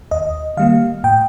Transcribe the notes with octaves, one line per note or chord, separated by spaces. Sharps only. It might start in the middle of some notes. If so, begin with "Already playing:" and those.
D#2 D#5
D#3 G3 A#3 F5
A2 G5